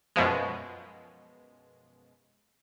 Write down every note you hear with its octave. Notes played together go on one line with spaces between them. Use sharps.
F#2 B2 F3 G#3